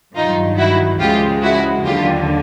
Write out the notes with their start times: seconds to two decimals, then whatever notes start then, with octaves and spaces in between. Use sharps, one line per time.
0.15 G2 D#3 F#3 D#4 F4
0.58 E4 F#4
1.00 C#2 C#3 F3 G#3 F4 G4
1.43 E4 F#4
1.85 D#2 D3 F#3 F4 G4